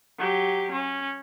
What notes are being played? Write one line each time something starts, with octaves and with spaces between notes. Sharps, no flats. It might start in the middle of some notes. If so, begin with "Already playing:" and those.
F#3 G4
C#4